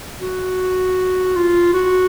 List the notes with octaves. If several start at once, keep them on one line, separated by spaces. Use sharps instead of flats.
F#4
F4
F#4